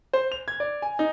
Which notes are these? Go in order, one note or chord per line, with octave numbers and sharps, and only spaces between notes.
C5
F7
G#6
D5
G#5
D#4